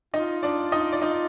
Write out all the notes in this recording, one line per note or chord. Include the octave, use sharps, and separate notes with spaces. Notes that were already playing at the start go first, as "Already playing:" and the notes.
D#4 F4 D#5
D4 D5
D#4 D#5
D5
D#4 F4 D#5